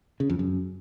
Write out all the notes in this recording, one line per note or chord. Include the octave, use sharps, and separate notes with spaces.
C#3
F2
F#2